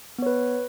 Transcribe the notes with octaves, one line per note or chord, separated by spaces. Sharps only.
B3 B4 C#5